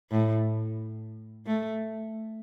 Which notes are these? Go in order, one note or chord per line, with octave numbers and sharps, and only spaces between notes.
A2
A3